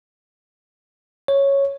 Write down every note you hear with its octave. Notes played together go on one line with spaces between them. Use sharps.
C#5